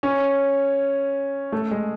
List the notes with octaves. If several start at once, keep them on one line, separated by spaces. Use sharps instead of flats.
C#4
A3
G#3